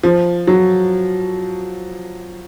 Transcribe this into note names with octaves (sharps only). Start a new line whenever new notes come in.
F3
F#3